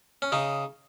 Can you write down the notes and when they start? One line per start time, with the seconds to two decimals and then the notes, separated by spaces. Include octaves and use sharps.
0.22 C#4
0.32 C#3 D#4